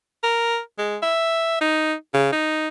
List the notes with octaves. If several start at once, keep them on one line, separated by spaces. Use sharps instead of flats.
A#4
G#3
E5
D#4
C#3
D#4